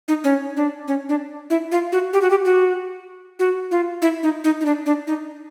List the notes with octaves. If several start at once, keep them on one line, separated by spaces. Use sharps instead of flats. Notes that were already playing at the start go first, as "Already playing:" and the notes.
D#4
C#4
D4
C#4
D4
E4
F4
F#4
G4
F#4
G4
F#4
F#4
F4
E4
D#4
D#4
D#4
D4
D4
D#4